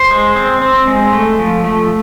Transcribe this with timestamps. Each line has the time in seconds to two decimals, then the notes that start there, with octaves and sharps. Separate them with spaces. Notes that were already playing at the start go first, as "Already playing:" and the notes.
Already playing: C5
0.11 G#3
0.36 C4
0.62 C4
0.87 G#3
1.13 A3
1.39 F3
1.64 A3